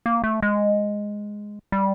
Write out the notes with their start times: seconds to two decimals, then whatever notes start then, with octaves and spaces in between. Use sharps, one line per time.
0.06 A#3
0.24 A3
0.43 G#3
1.72 G3